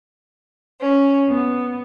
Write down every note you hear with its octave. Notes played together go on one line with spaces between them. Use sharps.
C#4
B3